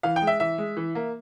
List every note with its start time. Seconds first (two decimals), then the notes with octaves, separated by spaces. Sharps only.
0.03 E3 F5
0.16 G5
0.22 G#3
0.27 E5
0.40 E3 E5
0.58 G#3
0.77 E3
0.95 A#3